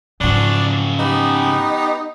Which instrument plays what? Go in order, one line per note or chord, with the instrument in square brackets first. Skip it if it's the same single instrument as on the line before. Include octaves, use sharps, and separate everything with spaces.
[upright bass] G#2 F3 [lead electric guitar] C#3 F#4 [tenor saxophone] D4
[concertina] B3 G4 B4 [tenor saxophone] D#4